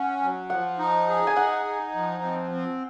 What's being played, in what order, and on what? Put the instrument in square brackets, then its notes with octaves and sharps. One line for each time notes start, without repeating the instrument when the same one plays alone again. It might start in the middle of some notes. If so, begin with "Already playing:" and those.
Already playing: [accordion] C#4 [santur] F#5
[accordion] F#3
[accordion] F3 [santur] F#5
[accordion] D#4
G#4
[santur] G#5
[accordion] D#4 [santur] F#5
[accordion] D#4
F3
C4
C4